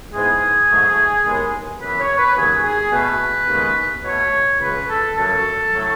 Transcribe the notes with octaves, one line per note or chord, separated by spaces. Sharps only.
G#2 E3 G#3 B3 G#4
G#2 F#3 A3
D#2 D#3 G#3 B3
F#2 E3 B3 B4
C#5
B4
D#2 C#3 F#3 B3 G#4
G#4
B2 A3 B4
D#2 C#3 G#3 B3
B2 A3 C#5
C#2 C#3 G#3 B4
A4
F#2 C#3 F#3 A4
A2 F#3 A3